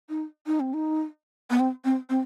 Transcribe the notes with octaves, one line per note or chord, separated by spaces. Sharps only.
D#4
D#4
C4
D#4
B3
C4
C4
C4